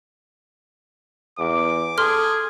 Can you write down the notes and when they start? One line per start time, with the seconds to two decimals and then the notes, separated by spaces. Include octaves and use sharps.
1.39 E2 D6
1.98 G#4 A4 C6 F6